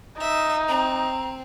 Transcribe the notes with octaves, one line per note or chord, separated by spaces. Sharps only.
D#4 E5
C4 A#5